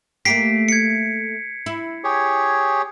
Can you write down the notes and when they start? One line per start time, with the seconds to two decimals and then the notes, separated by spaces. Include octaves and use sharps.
0.25 A3 A#3 G4 B6 C7 D7
0.69 G#6 C#7
1.66 E4
2.04 G4 G#4 C#5